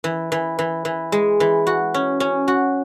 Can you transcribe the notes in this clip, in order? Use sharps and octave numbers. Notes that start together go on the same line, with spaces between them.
E3
E3
E3
E3
G#3
E3
F#4
C#4
C#4
F#4